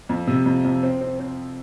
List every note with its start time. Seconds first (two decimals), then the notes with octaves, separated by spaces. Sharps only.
0.09 F2
0.27 C3
0.46 F2
0.65 F2
0.83 C4
1.01 C4
1.19 C4